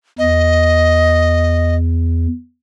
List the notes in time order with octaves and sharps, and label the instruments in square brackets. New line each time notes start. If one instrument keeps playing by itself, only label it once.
[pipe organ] E2 [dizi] D#5